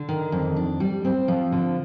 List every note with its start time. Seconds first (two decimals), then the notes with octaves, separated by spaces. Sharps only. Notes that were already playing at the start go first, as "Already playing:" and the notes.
Already playing: D3
0.09 D#3
0.32 F2
0.56 D4
0.80 G3
1.05 C4
1.28 F3
1.52 D3